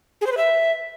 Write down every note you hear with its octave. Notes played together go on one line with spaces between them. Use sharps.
G#4
C5
B4
E5